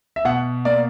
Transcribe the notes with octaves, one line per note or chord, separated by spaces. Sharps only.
E5
B2 F#5
A#3 D5